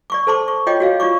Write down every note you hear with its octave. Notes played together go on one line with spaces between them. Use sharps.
D5 C#6 D6
A4 C5 A5 C6 D6
C#6
F4 C#5 D#5 G5 D6
F#4 C#5 F5
F4 D5 C#6 D6